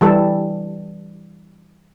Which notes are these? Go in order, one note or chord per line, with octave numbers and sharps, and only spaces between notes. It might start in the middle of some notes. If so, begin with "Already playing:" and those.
E3 G3 A4